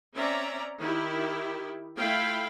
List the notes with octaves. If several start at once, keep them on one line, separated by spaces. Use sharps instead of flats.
C4 C#4 D5 E5 A#5
D#3 E4 G4
A3 E4 F4 F5 G5 B5